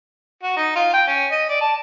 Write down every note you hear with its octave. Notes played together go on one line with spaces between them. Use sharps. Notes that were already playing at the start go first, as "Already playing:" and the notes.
F#4
D#4
F4
G5
C#4
D#5
D5
A5